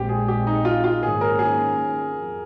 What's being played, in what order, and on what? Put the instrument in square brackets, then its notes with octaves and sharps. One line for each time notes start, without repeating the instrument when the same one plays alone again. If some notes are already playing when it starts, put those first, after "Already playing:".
Already playing: [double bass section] A#1 A#2 G#3 C4 [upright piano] G4
[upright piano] G#4
G4
D#4
F4
F4
[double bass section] G#2 D#3 A#3 C#4 [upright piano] G#4
[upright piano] A#4
G#4
[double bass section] F2